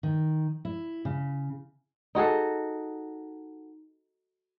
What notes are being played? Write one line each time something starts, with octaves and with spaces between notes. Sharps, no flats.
D#3
E4
C#3
D#4 F#4 G#4 A4